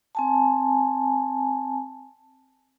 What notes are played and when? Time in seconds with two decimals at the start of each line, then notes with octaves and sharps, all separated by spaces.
0.15 C4 G#5 A5